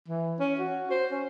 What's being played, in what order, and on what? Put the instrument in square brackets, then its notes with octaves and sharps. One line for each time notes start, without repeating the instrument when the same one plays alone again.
[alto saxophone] E3
C#4
F#4
C5
C#4